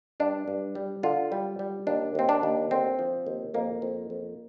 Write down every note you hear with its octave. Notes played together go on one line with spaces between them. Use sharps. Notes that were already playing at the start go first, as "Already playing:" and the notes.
G2 D4
G2
G3
D3 F4
G3
G3
D#2 D4
D#2 C4
D4
D#2
D3 C4
F3
D#2
F2 A#3
F2
F2